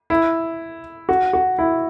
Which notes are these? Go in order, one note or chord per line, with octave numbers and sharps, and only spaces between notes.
E4
F#4
F#4
E4